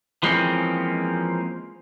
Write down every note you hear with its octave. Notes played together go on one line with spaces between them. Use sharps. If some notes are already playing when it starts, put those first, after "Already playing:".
E3 F3 G#3 A#3 C4 C#4